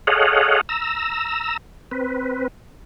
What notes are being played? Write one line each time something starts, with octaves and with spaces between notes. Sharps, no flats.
G#4 A4 C#5 D#5 F5 F#5
A#5 E6
C4 B4